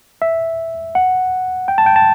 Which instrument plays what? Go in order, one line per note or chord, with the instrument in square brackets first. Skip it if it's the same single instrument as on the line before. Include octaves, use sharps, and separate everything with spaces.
[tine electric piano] E5
F#5
G5
A5
G5
A5